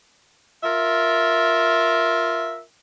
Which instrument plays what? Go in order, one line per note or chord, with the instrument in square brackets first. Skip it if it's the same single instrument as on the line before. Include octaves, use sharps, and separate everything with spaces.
[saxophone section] F4 A#4 E5